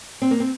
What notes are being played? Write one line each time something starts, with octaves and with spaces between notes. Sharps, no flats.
C4
A#3
C4